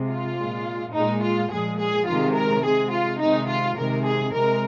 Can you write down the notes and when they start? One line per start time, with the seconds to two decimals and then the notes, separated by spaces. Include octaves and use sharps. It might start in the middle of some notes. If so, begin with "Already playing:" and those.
Already playing: C3 G#3
0.09 F4
0.37 A#2 G#3
0.93 A#2 G#3 D#4
1.22 F4
1.50 A#2 F3 G#3 G#4
1.79 G#4
2.07 C3 D#3 G#3 F4
2.35 A#4
2.63 C3 G#3 G#4
2.91 F4
3.20 C3 D#3 G#3 D#4
3.48 F4
3.76 C3 D#3 G#3 A#4
4.04 G#4
4.33 C3 G#3 A#4